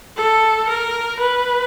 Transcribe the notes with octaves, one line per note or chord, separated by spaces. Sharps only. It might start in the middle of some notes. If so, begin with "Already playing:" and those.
A4
A#4
B4